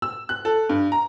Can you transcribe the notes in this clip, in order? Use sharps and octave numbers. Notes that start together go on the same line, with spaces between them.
E6
F#6
A4
G2
A#5